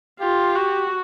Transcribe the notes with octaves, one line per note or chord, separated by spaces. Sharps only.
F4 G4
F#4